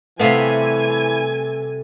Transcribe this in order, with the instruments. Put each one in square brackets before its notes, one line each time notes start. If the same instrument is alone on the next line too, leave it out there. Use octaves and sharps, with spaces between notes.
[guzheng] C3 G3 A3 [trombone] E3 [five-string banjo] B3 F5 [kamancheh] G#5